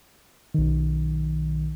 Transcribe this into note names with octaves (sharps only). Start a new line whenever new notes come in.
B1 D#3